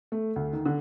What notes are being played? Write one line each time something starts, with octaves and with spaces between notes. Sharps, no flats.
A3
D2
D#3
D3